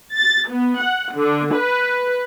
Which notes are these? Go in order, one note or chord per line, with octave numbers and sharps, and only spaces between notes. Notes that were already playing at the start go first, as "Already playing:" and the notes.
A6
B3
F#5
D3
B4